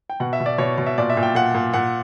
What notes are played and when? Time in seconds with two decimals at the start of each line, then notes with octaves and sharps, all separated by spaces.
0.10 G5
0.20 B2 F#5
0.33 E5
0.40 B2
0.46 D5
0.58 B2 C#5
0.78 B2
0.86 E5
0.98 A#2 D5
1.10 E5
1.17 A#2
1.23 G5
1.35 A#2 F#5
1.55 A#2
1.73 A#2 F#5